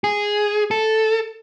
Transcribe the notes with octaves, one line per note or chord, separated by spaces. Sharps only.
G#4
A4